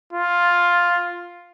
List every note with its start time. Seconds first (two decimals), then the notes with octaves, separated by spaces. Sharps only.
0.13 F4